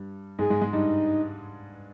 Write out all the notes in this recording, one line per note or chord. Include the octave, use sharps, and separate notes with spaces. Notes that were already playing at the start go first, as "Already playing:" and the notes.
Already playing: G2 G3
G#2 G#3 G#4
G#2 G#3
G#2 G#3
G2 G3 D#4